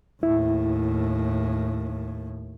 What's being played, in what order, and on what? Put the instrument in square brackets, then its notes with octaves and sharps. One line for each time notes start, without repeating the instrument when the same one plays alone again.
[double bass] D#2 A2 [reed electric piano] E4